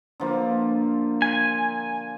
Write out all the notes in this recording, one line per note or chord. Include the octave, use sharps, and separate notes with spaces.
D3 F3 A#3
G#5